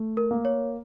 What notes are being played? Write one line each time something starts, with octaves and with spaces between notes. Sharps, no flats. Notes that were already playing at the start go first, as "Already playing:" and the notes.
Already playing: A3
A#4
A#3
C#5